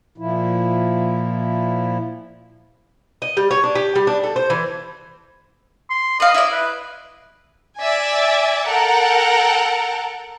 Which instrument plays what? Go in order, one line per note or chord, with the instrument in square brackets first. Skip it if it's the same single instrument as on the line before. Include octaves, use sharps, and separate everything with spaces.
[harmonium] A#2 F3 E4
[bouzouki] D#5
G3
C#5
D4
G4
G3
D4
A4
C5
E3
[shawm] C6
[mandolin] B4 F5 [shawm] D#5
[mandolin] E4 D5
[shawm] B4
[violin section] D5 E5 G#5
A4 A#4 F#5 G5 A5 A#5